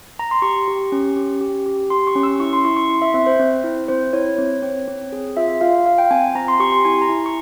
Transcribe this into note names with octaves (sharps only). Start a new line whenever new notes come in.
A#5
C6
G4 C#6
G4
C#4
G4
G4
G4
G4 C6
C#6
C#4
E6
E4 C#6
C6
E4 C#6
C#6
E4 C6
E5
C4 E5
C5
C4
E4
C4 C5
E4 C#5
C4
C4
C4
G#4
F4 E5
F4 F5
F4 F5
G5
C4 G#5
C4 A#5
C6
G4 C#6
C6
E4 G#5
A#5
E4
C#6